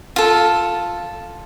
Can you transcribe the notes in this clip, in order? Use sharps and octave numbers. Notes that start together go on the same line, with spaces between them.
F4 A4